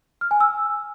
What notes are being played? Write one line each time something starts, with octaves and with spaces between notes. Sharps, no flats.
F6
G#5
E6